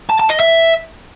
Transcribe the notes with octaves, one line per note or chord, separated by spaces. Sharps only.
A5
A5
D#5
E5